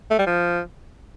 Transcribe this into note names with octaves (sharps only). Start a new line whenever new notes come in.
A3
G3
F3